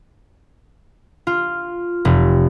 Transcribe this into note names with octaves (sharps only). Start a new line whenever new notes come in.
F4
F1